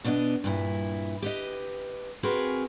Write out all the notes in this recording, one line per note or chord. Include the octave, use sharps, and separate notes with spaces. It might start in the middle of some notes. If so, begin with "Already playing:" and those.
B2 B3 D4 C#5 D#5
G2 A#2 E4
G4 B4 D#5
C4 F#4 G#4 A#4 B4